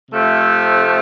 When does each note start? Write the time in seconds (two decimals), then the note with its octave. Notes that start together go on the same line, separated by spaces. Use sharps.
0.10 C3 F3 A3